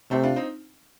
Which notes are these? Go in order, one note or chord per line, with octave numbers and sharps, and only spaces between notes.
C3 A3 C4
D4 F4
C4 D#4